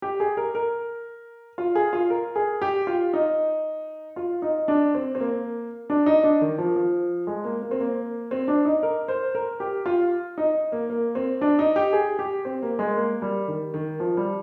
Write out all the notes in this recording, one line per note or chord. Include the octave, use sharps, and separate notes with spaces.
G4
G#4
A#4
A#4
F4
G#4
F4
A#4
G#4
G4
F4
D#4
F4
D#4
D4
C4
C4
A#3
D4
D#4
D4
D#3
F3
F3
G#3
A#3
A#3
C4
A#3
C4
D4
D#4
A#4
C5
A#4
G4
F4
D#4
A#3
A#3
C4
D4
D#4
G4
G#4
G4
C4
A#3
G#3
A#3
G3
D#3
D#3
F3
G3